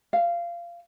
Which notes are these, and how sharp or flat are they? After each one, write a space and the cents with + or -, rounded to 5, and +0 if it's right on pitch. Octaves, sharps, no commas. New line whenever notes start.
F5 -20